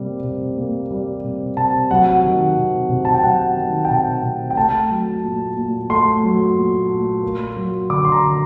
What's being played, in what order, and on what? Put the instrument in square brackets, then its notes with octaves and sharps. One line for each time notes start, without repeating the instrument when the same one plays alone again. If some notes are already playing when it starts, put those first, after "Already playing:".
Already playing: [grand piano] C3 G3 A#3
C3
A#3
G3
C3
C3 A5
F#3 F#5
D#3
C3
C3
A5
G5
F#3 F#5
D#3
G5
C3 A5
C3
G5
A3 A5
F#3
A#2
A#2
A3 C6
F#3
A#2
A#2
A#3
F#3
D3 D6
C6
A#5
D3